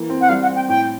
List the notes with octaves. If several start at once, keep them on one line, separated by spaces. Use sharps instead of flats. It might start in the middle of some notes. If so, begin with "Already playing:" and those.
Already playing: E3 A#3
C4
F#5
G3 F5
F#5
C4
G5
A2 G5